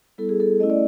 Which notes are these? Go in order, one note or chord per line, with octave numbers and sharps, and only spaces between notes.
G3 B3 E4 A4
G#4
A4
A3 C#4 E4 D#5
D5